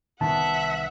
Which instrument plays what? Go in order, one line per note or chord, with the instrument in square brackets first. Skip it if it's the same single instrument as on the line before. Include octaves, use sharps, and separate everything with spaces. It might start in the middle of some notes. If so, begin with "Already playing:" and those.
[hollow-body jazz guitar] C2 D#3 B3 [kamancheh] E5 F#5 [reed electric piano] A5